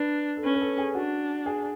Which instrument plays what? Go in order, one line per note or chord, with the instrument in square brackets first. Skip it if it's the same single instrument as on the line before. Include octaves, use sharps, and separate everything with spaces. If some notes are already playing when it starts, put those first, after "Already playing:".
Already playing: [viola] D4 [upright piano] B4
[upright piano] A4
[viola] C#4 [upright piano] B4
[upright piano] B4
A4
G#4
[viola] D4 [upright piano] F#4
[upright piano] G#4